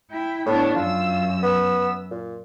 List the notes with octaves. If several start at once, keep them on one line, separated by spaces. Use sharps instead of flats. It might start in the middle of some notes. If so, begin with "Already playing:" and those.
E4 G5
A2 B3 D4 C#5
F#2 F4 E6
B3
A#2